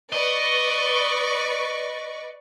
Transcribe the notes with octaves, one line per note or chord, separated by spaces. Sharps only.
B4 D5 D#5 C#6